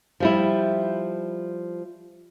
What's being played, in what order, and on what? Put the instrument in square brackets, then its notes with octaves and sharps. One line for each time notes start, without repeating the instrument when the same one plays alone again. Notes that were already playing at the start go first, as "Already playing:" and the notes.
[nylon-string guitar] F3 G3 E4